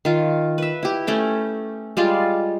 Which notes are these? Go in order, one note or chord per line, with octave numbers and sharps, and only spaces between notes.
D#3 F4
B4 E5
E4 G4
A3 C#4 G5
G3 G#3 F4 D5